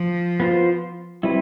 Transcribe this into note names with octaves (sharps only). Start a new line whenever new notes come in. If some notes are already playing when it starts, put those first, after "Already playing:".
Already playing: F3
B3 F4 C5
G3 C4 E4 B4